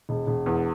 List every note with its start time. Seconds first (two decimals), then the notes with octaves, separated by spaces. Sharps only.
0.09 E1
0.27 E1
0.46 E2